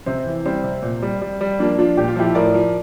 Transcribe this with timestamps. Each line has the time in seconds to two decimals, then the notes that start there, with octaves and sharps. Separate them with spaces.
0.06 C3 C4
0.26 E3
0.45 G3 C4
0.64 C3
0.82 A#2
1.02 G3
1.21 G3
1.41 G3
1.59 F3 A#3 D4
1.78 F3 D4 F4
1.97 A#2 G4
2.08 F4
2.16 F3 E4 G4
2.35 A2 A#4 D5
2.54 F3